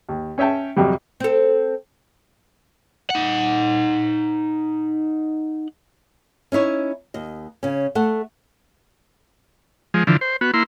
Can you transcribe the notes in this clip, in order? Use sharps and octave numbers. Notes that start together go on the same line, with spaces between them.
D#2
C#4 C#5 E5 G5 A5
F2 C3 F#3 G3
C4 A4
D#4 F#5
C#4 D#4 E4 C#5
D#2 D#5
C#3 C#4
A3 A4 F#5
F3 G#3
D3 E3 F3
C5
B3 F#4
A#3 E4 C6